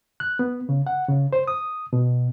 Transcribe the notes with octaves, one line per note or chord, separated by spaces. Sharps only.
F#6
B3
C#3
F#5
C#3
C5
D#6
B2